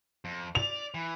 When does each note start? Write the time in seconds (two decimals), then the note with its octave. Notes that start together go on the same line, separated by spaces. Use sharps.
0.25 F2
0.55 D5 F7
0.94 E3